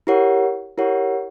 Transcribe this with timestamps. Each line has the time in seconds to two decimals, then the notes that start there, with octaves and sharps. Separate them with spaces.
0.07 E4 G4 A#4 C#5 F#5
0.78 E4 G4 A#4 C#5 F#5